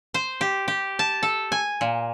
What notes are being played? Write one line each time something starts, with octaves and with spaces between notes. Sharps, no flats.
C5
G4
G4
A5
A4
G#5
A#2